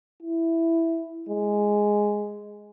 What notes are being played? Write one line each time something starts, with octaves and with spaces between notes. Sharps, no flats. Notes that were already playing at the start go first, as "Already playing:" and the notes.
E4
G#3